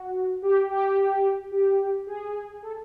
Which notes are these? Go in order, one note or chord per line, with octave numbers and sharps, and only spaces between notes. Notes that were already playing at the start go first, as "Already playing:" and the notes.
Already playing: F#4
G4
G4
G4
G#4
A4